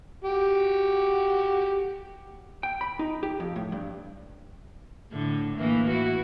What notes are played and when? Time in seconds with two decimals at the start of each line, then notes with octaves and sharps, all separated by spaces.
0.24 F#4 G4
2.63 G5
2.81 B5
2.99 D#4
3.23 G4
3.40 F2
3.56 A2
3.72 G2
5.13 A2 D3
5.57 A2 E3 A#3
5.91 E4 F#4